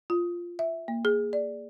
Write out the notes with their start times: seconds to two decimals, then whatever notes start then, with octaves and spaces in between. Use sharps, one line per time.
0.10 F4
0.59 E5
0.88 A#3
1.05 G#4
1.33 D5